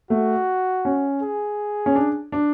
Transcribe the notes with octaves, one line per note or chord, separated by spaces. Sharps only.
A3 F#4
C#4
G#4
C#4
D4
D4